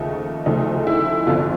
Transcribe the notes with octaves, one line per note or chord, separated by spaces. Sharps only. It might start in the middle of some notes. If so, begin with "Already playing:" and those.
Already playing: D#2 C#3 F3 A3 D#4
D2 C#3 F3 A3 D#4
E4
G1 F2 D3 F3 F4